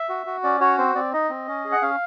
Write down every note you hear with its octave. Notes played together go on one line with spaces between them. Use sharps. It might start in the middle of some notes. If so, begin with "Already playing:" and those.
Already playing: E5
F#4
F#4
C#4 D5
F#4 C#5
C4 C5
C4 D5
D#4 D#5
C4
C#4
G#4
F#5
C#4 F5